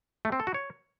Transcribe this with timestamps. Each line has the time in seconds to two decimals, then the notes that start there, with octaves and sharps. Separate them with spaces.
0.25 A3
0.32 C4
0.40 A4
0.47 F#4
0.54 C#5